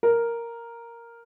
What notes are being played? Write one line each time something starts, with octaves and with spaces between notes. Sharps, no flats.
A#4